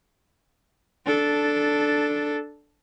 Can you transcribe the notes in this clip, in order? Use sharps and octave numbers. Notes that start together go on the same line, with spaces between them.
D4 A4